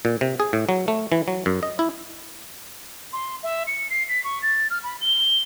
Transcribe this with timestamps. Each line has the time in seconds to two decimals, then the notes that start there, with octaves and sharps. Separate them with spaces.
0.05 A#2
0.21 C3
0.40 G#4
0.53 A2
0.69 F#3
0.88 A3
1.12 E3
1.28 F#3
1.46 F#2
1.63 D#5
1.79 E4
3.13 C6
3.43 E5
3.67 C#7
3.90 C7
4.08 B6
4.24 C#6
4.42 A6
4.70 F6
4.83 B5
5.01 G7